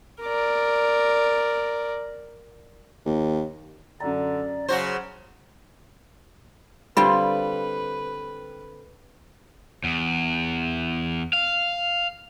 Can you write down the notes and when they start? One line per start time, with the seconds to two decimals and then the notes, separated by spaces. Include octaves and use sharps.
0.22 A#4 D5
3.06 D#2
4.00 F#2 D3 D5 A#5
4.69 C#3 F#3 F#4 C5
6.97 D3 G3 C4 F4 B4 B5
9.84 E2
11.33 F5